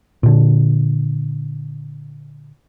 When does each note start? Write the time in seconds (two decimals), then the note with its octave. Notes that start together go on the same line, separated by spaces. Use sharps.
0.23 A#2 D3